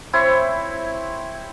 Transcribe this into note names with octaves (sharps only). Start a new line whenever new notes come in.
C4 E4 C5 C#5